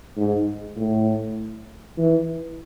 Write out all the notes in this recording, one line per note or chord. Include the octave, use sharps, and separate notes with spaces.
G#2
A2
E3